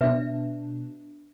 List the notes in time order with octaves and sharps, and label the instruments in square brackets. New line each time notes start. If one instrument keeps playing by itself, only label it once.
[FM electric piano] B2 D4 [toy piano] B4 E5